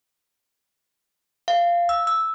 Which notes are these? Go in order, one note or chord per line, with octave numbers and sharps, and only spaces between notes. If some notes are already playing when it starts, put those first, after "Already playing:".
F5
E6
E6